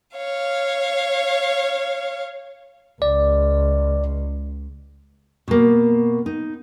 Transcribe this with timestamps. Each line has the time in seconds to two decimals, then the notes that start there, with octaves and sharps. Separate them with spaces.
0.17 C#5 F5
3.02 C#2 D5
5.48 B2 A#3
6.26 D#4